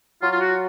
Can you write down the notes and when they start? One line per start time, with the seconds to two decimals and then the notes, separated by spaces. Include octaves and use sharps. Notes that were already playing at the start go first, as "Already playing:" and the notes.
0.21 F#3 F4
0.31 F4
0.40 F#4